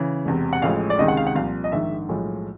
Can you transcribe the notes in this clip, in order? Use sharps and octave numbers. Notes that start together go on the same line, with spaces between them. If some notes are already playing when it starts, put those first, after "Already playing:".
Already playing: C#3 E3
E1 E2 C3
F#5
A1 A2 F3 G#3 F5
D5
C#2 C3 D#3 G#3 D#5
F#5
F5
F#5
C2 A#2 F3 F5
D#5
A#1 G#2 D#3 E5
B1 A2 F3 G#3